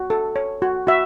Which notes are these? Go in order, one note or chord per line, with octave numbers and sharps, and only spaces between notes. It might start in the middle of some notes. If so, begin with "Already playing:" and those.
Already playing: F#4
A4
C#5
F#4
F#4 E5